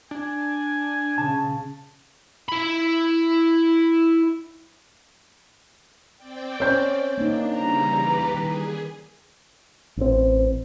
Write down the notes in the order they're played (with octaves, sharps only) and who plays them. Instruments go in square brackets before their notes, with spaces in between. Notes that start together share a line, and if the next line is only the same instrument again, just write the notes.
[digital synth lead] D4 [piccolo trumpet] G#5
[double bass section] C#3 [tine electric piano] A5
[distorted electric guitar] E4 B5
[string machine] C4 D5 G5
[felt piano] C#4 G6 [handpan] C5
[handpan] A#3 D#4 [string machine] D4
[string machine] C#3 E3 G3 [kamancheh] A#5
[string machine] G3 G4 B4
[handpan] D#3 [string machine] G#4
[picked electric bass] A1 C4